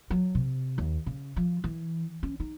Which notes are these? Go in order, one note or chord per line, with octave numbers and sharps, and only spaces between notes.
F#3
C3
D#2
C#3
F3
E3
C#4
D#4